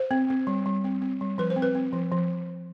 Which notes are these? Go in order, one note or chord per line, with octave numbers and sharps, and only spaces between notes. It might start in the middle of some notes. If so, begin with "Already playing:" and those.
Already playing: C5
C4
C4
G3
G3
C4
C4
G3
F3 B4
C5
C4
B4
C4
F3
F3